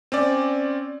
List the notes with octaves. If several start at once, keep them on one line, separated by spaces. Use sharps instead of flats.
C4 C#4 D5